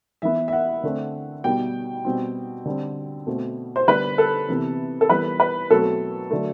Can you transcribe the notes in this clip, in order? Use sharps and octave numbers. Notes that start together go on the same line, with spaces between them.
E3 B3 E5
E5
F#5
D3 A3 C4
B2 G3 B3 G5
B2 G3 C4
D3 G3 C4
B2 A3 C4
C5
D3 G3 B3 B4
A4
C3 E3 B3
A4
E3 G3 B3 B4
B4
B2 F#3 A3 C4 A4
D3 F#3 A3